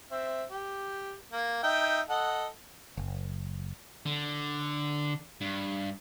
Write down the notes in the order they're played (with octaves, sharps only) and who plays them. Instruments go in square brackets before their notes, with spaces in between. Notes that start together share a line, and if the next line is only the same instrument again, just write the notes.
[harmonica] C4 E5
G4
A#3
D#4 E5 G5
A4 D#5 F#5
[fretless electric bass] F#1
[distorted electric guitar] D3
G2